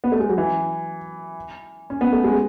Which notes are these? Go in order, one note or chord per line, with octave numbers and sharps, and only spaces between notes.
B3
A3
G#3
F#3
E3
C#4
B3
A3
G#3